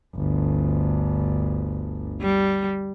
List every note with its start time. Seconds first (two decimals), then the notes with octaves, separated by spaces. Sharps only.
0.15 G1 D2
2.21 G3